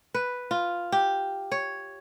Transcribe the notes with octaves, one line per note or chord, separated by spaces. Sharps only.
B4
F4
G4
C#5